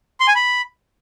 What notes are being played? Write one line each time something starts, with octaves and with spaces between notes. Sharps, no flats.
C6
G#5
B5